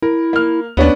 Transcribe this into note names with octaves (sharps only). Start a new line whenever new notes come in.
E4 A#4
A#3 F6
D#2 B3 C#4 D4